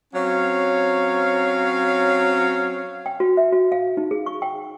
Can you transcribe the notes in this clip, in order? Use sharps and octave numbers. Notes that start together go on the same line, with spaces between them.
F#3 C4 C#4 C#5 F5
G5
F#4
E5
F#4
F5
D#4
G#4
C#6
G5